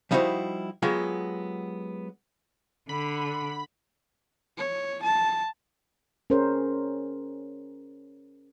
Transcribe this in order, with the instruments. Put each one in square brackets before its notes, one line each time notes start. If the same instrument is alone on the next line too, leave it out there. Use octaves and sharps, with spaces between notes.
[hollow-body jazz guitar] F3 G3 D#4 E4 F#4 C5
F#3 G#3 B3 F4 G4
[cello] D3 [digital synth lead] B5
[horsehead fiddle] C#5
A5
[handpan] C#4 G#4 A#4 C5 C#5